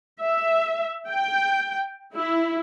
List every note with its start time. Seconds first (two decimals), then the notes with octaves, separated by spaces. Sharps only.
0.23 E5
1.10 G5
2.14 E4